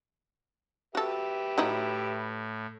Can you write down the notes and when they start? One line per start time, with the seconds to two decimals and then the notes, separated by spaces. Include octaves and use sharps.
0.95 F#4 G4 A4 B4 E5
1.58 A2 F#3 D#4 E4